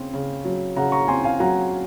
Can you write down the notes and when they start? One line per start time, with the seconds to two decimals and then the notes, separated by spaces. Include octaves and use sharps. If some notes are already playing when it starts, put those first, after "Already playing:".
Already playing: C#3 C4
0.13 C#3
0.45 F#3
0.76 C#3 F#5 A#5
0.92 A#5 C#6
1.08 C4 G#5 C6
1.24 F5 G#5
1.40 F#3 F#5 A#5